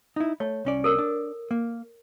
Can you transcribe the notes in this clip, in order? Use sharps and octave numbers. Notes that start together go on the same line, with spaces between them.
D#4 E4
A3 C#5
C2 C#4 D5
A4 A#4
D4
A#3